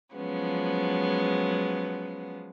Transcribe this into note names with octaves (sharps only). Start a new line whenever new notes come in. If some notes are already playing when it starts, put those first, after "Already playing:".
F3 F#3 G#3 B3 C#4